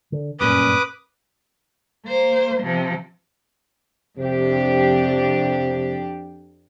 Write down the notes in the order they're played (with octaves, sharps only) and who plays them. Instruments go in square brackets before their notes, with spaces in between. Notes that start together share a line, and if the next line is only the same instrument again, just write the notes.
[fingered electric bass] D3
[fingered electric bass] G1 F#2 A#2 [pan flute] C#4 [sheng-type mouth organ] B4 D6 D#6
[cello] A#3 C5
C3 F3
[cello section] F2 D4 G4 [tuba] C3